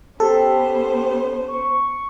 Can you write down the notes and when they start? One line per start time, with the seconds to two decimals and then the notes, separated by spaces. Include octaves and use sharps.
0.20 B3 C#4 G4 A4 C5
1.48 C#6